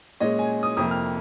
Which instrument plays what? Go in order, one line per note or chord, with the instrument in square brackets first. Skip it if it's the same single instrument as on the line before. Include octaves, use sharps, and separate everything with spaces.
[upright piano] A#2 G#3 C#4 D#5
G#5
D#6
F2 C3 F3 A#3 D#6
F6